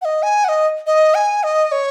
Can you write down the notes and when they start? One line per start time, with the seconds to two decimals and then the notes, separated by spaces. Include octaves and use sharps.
0.02 F#5
0.05 D#5
0.23 G#5
0.44 F#5
0.49 D#5
0.87 D#5
1.15 G#5
1.43 D#5
1.72 C#5